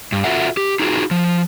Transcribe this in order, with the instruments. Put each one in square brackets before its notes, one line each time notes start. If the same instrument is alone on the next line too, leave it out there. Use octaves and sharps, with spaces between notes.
[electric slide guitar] G2
F4 F#4 A4 E5 F#5
G4
D#4 F4 F#4 G#4
F3